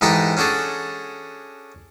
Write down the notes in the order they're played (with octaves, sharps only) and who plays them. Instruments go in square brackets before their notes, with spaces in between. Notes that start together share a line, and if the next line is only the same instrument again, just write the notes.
[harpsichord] G#2 E3 D#4 G4 A4 G5
C#4 D4 F#4 G#4 A4